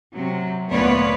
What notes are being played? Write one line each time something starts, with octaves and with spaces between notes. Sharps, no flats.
C3 F#3
D2 A#2 B3 B4 C#5 D5